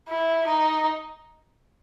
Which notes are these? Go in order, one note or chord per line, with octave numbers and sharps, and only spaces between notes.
E4
D#4